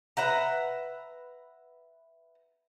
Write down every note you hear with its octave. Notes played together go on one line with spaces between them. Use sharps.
B4 E5 F#5 A#5